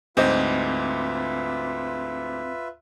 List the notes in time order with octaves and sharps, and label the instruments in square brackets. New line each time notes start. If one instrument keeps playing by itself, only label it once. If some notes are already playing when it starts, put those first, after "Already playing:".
[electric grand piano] D2 G#2 [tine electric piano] C4 [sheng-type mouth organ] F4 B4 E5 [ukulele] C5 D#5